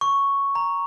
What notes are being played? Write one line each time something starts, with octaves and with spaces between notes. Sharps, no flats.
C#6
A#5